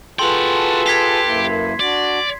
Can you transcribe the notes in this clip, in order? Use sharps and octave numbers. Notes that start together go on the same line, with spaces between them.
F4 F#4 G#4 A4 B4 G5 A5 C6
G4 G#6 B6 C7
F#2 A#3 E4
D4 F#4 D5